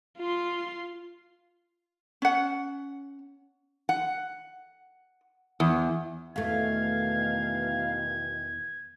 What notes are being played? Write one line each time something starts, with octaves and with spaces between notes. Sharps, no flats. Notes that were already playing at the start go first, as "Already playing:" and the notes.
F4 C6
C#4 F#5
F#5
E2
E2 B2 D#3 E3 A3 F5 G#6